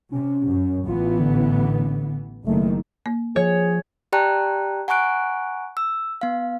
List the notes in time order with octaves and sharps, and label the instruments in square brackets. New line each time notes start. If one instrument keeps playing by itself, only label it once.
[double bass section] C3 [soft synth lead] C#4
[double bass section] F#2
[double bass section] A1 E3 B3 [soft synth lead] F4
[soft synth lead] D3
[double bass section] F#1 D#3 [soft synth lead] A3
[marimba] A#3
[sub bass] F3 [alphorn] G#4 [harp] C#5
[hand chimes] G4 D5 G5 A5 A#5 F#6
F#5 G#5 A#5 C#6 F#6 D7
E6
B3 F5